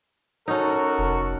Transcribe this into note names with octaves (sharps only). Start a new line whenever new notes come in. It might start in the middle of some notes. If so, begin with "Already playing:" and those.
C#4 D#4 F#4 A4 A#4
F1